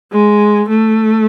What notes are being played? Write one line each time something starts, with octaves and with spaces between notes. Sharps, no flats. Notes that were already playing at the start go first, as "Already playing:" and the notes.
G#3
A3